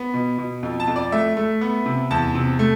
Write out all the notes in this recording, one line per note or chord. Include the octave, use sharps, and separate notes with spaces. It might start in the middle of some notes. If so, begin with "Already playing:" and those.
Already playing: B3
B2
B2
F2
A5
F2
D5
A3 E5
A3
B3
C3
E2 A5
C3
A3